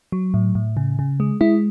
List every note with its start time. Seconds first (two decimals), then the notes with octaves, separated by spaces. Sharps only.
0.12 F#3
0.34 A2
0.55 A2
0.77 C#3
0.99 C#3
1.20 G#3
1.41 G#3 E4